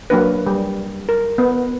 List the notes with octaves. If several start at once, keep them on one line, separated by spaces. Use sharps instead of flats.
F#3 A#3 D4 B4
G3
A#4
B3